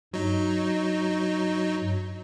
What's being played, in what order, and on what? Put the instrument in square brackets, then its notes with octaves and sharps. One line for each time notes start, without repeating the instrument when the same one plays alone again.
[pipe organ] G2 [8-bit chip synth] F#3 D#4